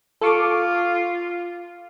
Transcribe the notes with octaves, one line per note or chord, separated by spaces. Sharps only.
F4 A4 C#6 D6